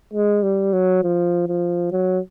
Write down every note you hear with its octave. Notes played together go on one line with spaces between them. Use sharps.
G#3
G3
F#3
F3
F3
F#3